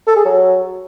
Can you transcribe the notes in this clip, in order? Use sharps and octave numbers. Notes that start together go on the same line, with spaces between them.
A4
G#4
F#3